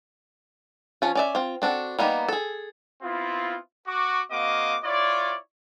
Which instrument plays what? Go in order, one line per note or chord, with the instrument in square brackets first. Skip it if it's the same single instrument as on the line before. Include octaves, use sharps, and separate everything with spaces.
[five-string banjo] F3 C#4 F4
C#4 D5 E5
C4 F4
C4 D4 F#4 A4
G3 A#3 B3 D#4
G#4 A4
[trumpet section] B3 C4 E4 F4
F#4 C#6 D6
A#3 C4 F#4 D#5 F5 D6
E4 F4 C#5 D5